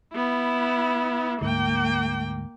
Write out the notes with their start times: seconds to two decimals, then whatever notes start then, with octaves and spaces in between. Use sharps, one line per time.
0.13 B3 E4
1.41 D2 G#2 A#3 G5